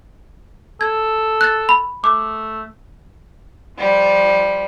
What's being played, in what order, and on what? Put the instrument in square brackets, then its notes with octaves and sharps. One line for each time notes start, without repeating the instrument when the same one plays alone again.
[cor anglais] A4 [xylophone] G#6
[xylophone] F#6 A6
B5
[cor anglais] A3 [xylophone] D6
[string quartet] F3 G3